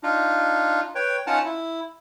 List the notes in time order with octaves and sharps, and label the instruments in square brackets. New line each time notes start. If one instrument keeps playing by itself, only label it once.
[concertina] D4 D#4 F4
B4 C#5 G5
C#4 D#4 F4 F#5 A5 F6
E4